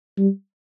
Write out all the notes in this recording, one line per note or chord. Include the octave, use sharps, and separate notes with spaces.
G3